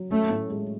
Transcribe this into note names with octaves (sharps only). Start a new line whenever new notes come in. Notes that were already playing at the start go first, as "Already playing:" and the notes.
Already playing: F#3
A3 C#4
A2
G#3